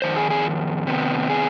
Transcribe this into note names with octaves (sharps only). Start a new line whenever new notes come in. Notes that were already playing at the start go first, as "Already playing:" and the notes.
F2 D#3 C5
G#4
G#4
C3 D#3 B3
G#4